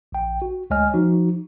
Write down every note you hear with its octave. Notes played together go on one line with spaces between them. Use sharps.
A#1 G5
F#4
D2 G#3 C#5 D#5 G#5 F6
F3 D#4 F#4